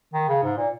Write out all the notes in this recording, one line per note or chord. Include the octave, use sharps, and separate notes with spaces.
D#3
C#3
G#2
A#2